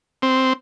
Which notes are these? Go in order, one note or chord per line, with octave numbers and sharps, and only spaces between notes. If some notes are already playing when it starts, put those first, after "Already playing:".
C4